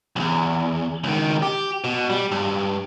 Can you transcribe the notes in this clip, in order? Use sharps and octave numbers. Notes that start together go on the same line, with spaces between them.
B1 E2
C#2 D#3
G4
B2
G3
G2